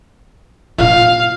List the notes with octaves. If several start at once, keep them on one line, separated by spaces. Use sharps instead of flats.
A#2 F4 F5